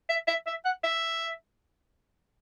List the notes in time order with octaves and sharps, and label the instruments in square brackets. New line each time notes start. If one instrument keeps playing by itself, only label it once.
[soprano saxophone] E5
E5
E5
F#5
E5